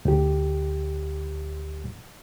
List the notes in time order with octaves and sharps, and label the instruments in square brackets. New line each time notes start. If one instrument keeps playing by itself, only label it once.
[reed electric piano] D2 G4